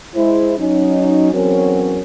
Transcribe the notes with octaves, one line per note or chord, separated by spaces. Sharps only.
G#3 E4 C5
F#3 C#4 D#4
E2 F#3 C4 C#4 F#4 A#4